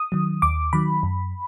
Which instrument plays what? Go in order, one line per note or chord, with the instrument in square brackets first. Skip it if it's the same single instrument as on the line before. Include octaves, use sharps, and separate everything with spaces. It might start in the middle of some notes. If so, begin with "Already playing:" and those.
Already playing: [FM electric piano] D#6
D#3 F#3
D#2 D6
D#3 F#3 B5
F#2